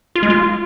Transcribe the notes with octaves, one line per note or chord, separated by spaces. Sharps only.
F4
G#3
F4